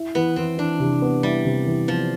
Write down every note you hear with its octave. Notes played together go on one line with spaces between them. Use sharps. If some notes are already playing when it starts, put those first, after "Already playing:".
Already playing: E4
E3 B3
E3 C4
E3 D4
C3
B3
G3 E4
C3
E3
F3 B3